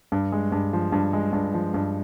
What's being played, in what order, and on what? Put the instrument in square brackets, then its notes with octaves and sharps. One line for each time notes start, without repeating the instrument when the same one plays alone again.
[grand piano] G2
G#3
G2
F3
G2
G#3
G2
F3
G2